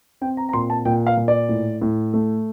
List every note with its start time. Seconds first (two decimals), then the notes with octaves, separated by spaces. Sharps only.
0.21 C4 G5
0.37 A#5
0.49 A#5
0.53 A#2 C6
0.70 A5
0.85 A#2 G5
1.07 F5
1.17 A#2
1.28 D5
1.49 A2
1.82 A2
2.14 A3